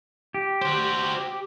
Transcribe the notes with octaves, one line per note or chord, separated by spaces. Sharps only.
G4
F#4 C5